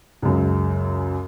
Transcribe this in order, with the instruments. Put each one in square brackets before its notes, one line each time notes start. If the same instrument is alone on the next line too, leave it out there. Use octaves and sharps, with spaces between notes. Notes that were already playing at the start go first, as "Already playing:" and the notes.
[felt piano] C#2 F#2